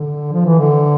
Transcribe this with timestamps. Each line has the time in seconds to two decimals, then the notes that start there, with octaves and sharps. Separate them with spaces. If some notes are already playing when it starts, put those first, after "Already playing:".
Already playing: D3
0.32 F3
0.45 E3
0.59 D3